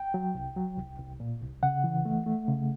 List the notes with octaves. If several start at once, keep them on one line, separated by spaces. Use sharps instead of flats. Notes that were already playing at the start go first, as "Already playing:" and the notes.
Already playing: G5
F#3
C2
F#3
C2
C2
A#2
C2
C#3 F#5
E3
A3
A3
C#3